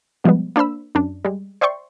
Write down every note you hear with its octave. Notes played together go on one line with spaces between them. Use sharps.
B2 F3 G3 G#3 B3
A#3 D4 C5 B5 E6
F#2 D4
G3 G#3
C5 D5 E5 G5 C6 C#6